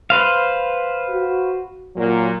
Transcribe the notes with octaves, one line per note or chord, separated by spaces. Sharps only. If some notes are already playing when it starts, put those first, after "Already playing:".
B4 C5 F5
F#4
A#2 F#3